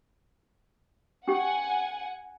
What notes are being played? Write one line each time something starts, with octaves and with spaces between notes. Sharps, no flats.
C#4 G4 F#5 G#5